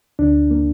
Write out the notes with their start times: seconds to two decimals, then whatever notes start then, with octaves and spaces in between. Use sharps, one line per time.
0.19 D2 D4
0.51 A#3